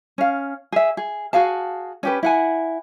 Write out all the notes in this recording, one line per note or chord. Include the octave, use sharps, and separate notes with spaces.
C#4 F5
G#4 E5
G#4
F#4 G#4 F5 A5
C#4 G4 B4
E4 F#5 G#5